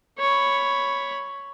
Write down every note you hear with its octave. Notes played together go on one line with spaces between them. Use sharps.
C#5 B5